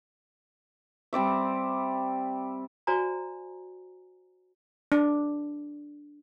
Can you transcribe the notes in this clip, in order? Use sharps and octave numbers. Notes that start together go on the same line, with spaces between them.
G3 C4 D5 E5
F#4 C5 D5 G#5 A#5
D4